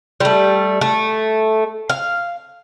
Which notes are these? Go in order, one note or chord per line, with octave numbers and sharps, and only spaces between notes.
G3 A3
A3
F5